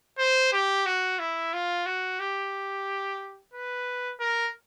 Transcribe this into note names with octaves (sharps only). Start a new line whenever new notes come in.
C5
G4
F#4
E4
F4
F#4
G4
B4
A#4